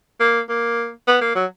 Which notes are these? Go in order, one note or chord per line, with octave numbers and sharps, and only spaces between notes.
A#3
A#3
B3
A#3
F#3